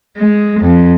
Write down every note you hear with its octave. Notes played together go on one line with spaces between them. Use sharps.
G#3
F2